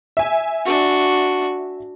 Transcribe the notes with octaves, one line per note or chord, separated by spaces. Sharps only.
E5 G#5
D4 F#4